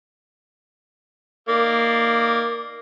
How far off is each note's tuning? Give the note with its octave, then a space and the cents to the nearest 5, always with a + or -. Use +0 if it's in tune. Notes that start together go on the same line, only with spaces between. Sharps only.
A#3 -5 D#4 +0 D5 +0